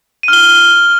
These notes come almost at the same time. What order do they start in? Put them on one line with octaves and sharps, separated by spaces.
D#7 F6 G7